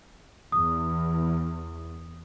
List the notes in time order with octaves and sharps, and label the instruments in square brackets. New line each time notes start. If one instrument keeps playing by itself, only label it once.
[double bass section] E2 [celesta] D#6